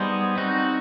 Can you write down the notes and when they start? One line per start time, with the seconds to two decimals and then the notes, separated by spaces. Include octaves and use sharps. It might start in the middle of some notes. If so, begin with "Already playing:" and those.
Already playing: G3 B3 D#4 G#4 C5
0.37 C4 D#4 F#4